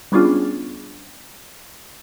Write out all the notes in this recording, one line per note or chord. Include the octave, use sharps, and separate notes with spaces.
G3 B3 C#4 D4 F4 G#4